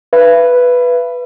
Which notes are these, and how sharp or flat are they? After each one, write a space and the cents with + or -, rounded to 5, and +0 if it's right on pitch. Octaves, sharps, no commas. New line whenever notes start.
B4 +0 E5 +45